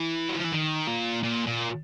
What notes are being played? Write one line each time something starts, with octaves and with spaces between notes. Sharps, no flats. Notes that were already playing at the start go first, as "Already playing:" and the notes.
Already playing: E3
F#3
F3
E3
D#3
A#2
A#2
A#2